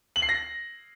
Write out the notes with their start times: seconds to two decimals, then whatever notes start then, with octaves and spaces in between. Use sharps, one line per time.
0.16 F#7
0.22 C7
0.29 A#6